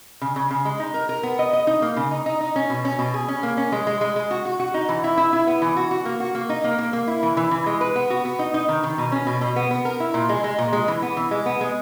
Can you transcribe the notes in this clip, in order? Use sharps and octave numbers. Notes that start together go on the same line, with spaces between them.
C#3
C#3
C#3
G#3
D#4
A#4
A#4
B3
D#5
D#5
D#4
A#3
C#3
D#4
D#4
D#4
C#4
B2
C#4
B2
G#4
C#4
A#3
C#4
G#3
G#3
G#3
G#3
F#4
F#4
F#4
D#4
E3
E4
E4
E4
B3
E3
F#4
F#4
A#3
F#4
A#3
D#4
A#3
A#3
A#3
E4
E3
E3
E3
G#3
B4
B3
F#4
B3
D#4
D#4
D#3
D#3
B2
C#4
B2
B2
B3
B3
A#4
E4
A#2
G#3
G#3
A#2
G#3
E3
B3
E3
G#3
B3
G#3